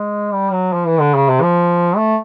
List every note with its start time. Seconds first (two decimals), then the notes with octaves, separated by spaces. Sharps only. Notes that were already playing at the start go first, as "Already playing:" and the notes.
Already playing: G#3
0.33 G3
0.52 F#3
0.73 F3
0.87 E3
1.00 D3
1.15 C#3
1.29 C3
1.42 F3
1.96 A3